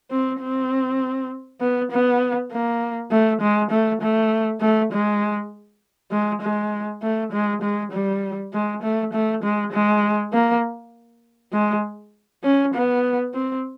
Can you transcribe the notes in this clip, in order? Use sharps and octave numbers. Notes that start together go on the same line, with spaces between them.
C4
C4
B3
B3
A#3
A3
G#3
A3
A3
A3
G#3
G#3
G#3
A3
G#3
G#3
G3
G#3
A3
A3
G#3
G#3
A#3
G#3
C#4
B3
C4